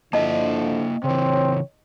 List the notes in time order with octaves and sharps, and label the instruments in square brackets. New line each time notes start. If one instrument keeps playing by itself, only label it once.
[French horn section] D3 F3 [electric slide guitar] A#3 E4 E5 [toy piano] D#5 A5
[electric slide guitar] C#3 E3 [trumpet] C4 [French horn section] C#5